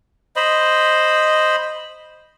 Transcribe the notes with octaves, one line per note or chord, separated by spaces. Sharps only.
C5 D#5 B5